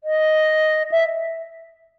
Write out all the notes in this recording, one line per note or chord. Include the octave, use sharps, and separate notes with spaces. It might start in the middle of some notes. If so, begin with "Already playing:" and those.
D#5
E5